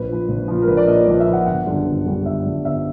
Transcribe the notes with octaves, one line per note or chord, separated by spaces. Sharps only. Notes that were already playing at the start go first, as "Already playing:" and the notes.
Already playing: A#1 B4
A#2 F3
A#1
A#2 F3
A#4
A#1 B4
D5
A#2 F3 D#5
C#5
A#1 D5
E5
A#2 F3
F#5
G1 F#5
F#2 D3 G3
G1
F#2 D3 G3
G1 E5
F#2 D3 G3
G1 E5